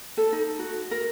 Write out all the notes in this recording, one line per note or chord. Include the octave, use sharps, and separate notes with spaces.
A4
D#4
F#4
A#4